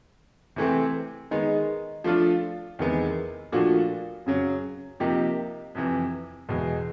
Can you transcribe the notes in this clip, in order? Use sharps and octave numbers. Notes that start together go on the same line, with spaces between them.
C3 E3 A3 C4
D#3 G#3 B3 D#4
F3 A3 D4 F4 A4
E2 C3 D#3 G#3 B3
A#2 F3 A3 D4 F#4
F#2 C#3 F#3
C3 F3 A#3 D#4 G4
F2 C3 E3
E2 B2 G#3